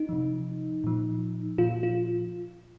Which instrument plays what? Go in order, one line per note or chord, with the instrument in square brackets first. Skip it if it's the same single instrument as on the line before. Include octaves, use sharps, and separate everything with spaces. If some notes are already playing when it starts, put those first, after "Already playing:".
Already playing: [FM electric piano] D#4
C3 F3
A#2 F3
A#2 F3 F4
F4